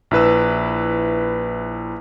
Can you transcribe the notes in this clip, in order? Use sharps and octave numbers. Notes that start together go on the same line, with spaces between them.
A#1 E4 B4 E6